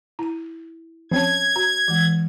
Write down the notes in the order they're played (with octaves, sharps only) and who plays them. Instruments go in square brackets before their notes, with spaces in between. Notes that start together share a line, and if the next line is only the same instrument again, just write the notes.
[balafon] E4 [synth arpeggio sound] A#5 D#7
[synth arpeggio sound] F3 C4 C7 [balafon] C#4 C#5 A5 [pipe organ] G#6
[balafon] F#4 [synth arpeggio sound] A#5
[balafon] E3 G#3